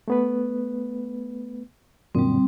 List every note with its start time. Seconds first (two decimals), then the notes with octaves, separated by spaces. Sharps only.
0.08 A3 B3 B4
2.15 F#2 A#2 D3 G3 C4